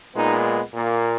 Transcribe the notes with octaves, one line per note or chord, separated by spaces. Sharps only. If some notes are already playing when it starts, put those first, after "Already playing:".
A#2 G#3 B3 D#4
A#2 A#3